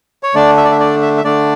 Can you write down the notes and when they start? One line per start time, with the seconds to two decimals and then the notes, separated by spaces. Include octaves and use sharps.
0.23 C#5
0.35 D3 A3 D4 D5
0.57 E5
0.64 D5
0.71 E5
0.80 D5
1.02 E5
1.17 E5
1.25 D3 A3 D4 D5